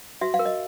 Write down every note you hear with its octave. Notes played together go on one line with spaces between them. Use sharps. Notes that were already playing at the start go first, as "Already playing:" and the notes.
F#4 E5
F5
A#4
D#5